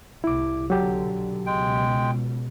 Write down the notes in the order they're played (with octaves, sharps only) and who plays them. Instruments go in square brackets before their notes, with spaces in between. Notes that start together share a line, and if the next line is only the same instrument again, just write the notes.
[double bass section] C2 A2 [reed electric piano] E4 D6
[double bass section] B1 D3 [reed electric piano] F#3 G4
[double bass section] C#2 B2 [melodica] G#3 G5